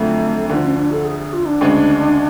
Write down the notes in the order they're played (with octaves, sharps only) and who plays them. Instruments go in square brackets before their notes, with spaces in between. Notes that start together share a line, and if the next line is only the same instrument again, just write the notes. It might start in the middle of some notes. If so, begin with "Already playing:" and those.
Already playing: [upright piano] F2 D3 F#3 [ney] A3
[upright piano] D2 D3 F3
[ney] C#4
D4
A4
G#4
G#4
F4
D4
[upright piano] D2 C#3 G#3